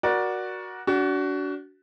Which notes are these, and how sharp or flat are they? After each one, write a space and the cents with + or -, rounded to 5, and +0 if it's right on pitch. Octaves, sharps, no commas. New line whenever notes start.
F#4 +0 A#4 +30 D5 +0
D4 -30 F#4 +20